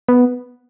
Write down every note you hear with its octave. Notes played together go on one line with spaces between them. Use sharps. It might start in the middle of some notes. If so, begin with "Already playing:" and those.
B3